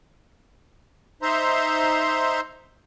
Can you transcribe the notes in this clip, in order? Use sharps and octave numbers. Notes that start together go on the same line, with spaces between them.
D#4 C5 E5 A#5 C6